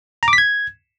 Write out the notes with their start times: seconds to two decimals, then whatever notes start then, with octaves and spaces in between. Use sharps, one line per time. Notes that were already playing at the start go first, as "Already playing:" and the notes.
0.23 A#5
0.28 D6
0.33 B6
0.38 G#6